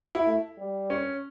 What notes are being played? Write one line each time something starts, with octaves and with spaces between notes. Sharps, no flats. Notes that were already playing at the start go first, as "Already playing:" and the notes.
E4
A3
G3
C#4